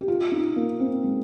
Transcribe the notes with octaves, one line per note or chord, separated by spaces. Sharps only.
G4
F4
D#4
A#3
C4
G#3